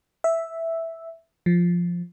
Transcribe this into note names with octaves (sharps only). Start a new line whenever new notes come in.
E5
F3